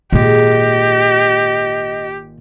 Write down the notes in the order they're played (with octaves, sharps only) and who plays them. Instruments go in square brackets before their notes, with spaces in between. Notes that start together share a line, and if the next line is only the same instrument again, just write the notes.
[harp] G#1 G#3 D7 [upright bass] A#2 [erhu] G4 [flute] D#5